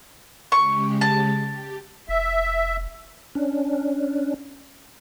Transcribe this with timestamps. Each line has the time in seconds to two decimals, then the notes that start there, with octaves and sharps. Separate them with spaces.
0.52 C#3 G#3 G4 C#6
1.01 A5
1.48 G4
2.09 F1 E5
3.35 C#4 D4